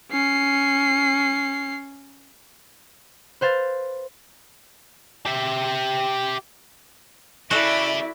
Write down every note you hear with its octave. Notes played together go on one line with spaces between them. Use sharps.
C#4 C7
B4 C5 F5 A6
G4 E5
C#3 E4 F#4 A4 D5 E5